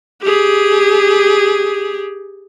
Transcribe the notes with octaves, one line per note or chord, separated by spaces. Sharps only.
G4 G#4